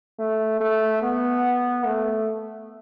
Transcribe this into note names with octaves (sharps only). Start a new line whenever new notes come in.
A3
A3
B3
A3